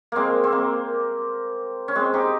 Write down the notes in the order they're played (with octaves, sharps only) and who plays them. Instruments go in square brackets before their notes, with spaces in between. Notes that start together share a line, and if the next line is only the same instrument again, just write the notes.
[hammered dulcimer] G#3 A#3 C4
C4
A#3
C#4
G#3 C4
D#4 G4